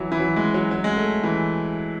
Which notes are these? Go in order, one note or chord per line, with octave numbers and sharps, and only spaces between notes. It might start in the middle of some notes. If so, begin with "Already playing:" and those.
Already playing: E3 F#3
E3
F#3
G#3
F#3
F#3
G#3
A3
E3